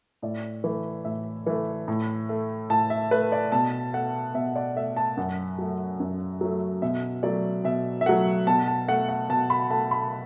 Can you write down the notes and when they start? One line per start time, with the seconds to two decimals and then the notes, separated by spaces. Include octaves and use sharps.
0.22 A2 D5
0.64 E3 A3
1.05 A2 E5
1.46 E3 A3
1.88 A2
2.29 A3
2.70 A2 A5
2.90 E5
3.11 A3 B4
3.32 D5
3.52 B2 A5
3.93 A3 F#5
4.34 B2 E5
4.56 D5
4.76 A3 E5
4.96 A5
5.17 F#2 F#5
5.58 F#3 A3
6.00 F#2
6.41 F#3 A3
6.82 B2 E5
7.23 F#3 A3 D5
7.64 B2 E5
8.01 E5
8.06 F#3 A3 F#5
8.47 B2 A5
8.68 A5
8.88 A3 F#5
9.09 F#5
9.29 B2 A5
9.50 B5
9.70 A3 A5
9.91 B5